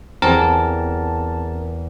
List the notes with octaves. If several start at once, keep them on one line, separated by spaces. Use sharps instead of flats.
E2 C4 G4 G#4 A#4 A5